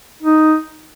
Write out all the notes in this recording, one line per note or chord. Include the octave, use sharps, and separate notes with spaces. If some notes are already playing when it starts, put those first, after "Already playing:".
D#4